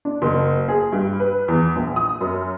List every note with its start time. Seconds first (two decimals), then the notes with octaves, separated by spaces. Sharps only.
0.05 D4
0.22 F#1
0.68 G#4
0.92 G2
1.20 B4
1.48 E2
1.76 A#1
1.96 D#6
2.21 F#2